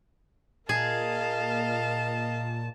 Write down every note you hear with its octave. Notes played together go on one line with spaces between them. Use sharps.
A#2 G#4 A#4 D#5 F5 A5